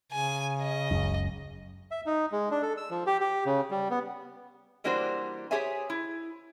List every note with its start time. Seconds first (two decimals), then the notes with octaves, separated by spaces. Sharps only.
0.12 C#3 G#5
0.62 D#5
0.91 F#1 C#2 F#2
1.91 E5
2.06 D#4
2.32 G#3
2.51 D4
2.62 A4
2.77 E6
2.90 F3
3.07 G4
3.21 G4
3.46 C#3
3.71 G3
3.91 B3
4.84 E3 G3 A#3 D4 F#4 C5
5.51 G4 G#4 B4 C#5 E5 G#5
5.90 E4